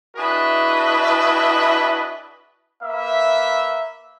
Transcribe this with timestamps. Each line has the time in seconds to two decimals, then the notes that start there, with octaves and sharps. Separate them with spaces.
0.17 D4 E4 F#4 G#4 B4 D#5
2.84 A#3 B4 E5